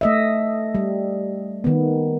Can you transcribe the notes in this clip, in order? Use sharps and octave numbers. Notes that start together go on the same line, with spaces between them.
A3 D#5 E5
G3
D#3 B3